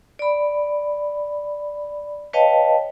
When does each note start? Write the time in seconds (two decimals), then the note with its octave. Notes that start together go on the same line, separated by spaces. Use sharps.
0.19 D5 B5
2.33 B4 C#5 D#5 F5 G5 A5